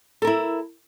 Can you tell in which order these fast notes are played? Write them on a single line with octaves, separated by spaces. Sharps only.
A4 A#4 E4